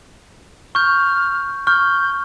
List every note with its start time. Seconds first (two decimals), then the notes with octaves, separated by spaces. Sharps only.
0.75 C#6 F6 G6
1.67 C#6 F6 G6